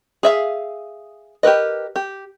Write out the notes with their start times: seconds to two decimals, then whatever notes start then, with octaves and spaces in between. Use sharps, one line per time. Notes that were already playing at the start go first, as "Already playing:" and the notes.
0.23 G#4 E5 F5
1.43 G4 A#4 B4 D#5
1.96 G4